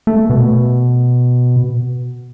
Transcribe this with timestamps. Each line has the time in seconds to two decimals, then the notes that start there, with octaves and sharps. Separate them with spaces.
0.07 A3
0.30 B2